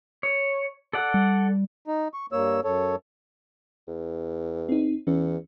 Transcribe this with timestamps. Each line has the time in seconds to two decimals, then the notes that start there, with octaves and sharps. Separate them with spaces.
0.23 C#5
0.93 A4 D5 F#5
1.14 G3
1.87 D#4
2.14 C#6
2.32 G2 A#3 C#5 E6
2.64 F#2 A4 C#5
3.88 E2
4.69 C4 D#4
5.07 E2 E3 C#4